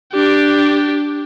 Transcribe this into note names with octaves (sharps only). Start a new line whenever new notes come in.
D4 G4